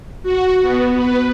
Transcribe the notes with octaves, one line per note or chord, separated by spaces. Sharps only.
F#4
B3
B4